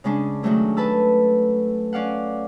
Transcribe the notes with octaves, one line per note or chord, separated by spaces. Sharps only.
C#3 G#3 C#4 D4
D#3 F#3 G#3 A3 G#4
A4 B4 A5 E6
C#4 D5 F5 F#5